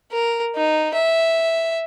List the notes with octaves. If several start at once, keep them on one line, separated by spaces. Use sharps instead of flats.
A#4
D#4
E5